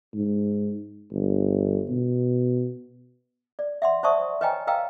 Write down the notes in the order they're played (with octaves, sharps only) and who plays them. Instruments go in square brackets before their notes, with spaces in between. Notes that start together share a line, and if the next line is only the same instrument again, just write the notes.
[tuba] G#2
G1
B2
[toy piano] D5
E5 F#5 C6
C5 D5 E5 A5 C#6 D#6
B4 C#5 D#5 G5 G#5 A#5
B4 D#5 F5 G5 A#5 E6